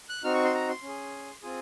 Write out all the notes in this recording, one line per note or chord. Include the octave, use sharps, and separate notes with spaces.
F#6
C4 D#4 F#4 F6
C#6
C6
A#5
C6
C#4
G#4
C4 F4 G#4